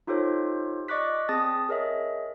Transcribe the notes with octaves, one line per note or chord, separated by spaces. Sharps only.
D#4 F4 G4 A4 C5 C#5
D5 D#5 C#6 D6 F#6 B6
C4 G#4 A5 D#6 A6 A#6
G#4 A#4 C#5 D#5 E5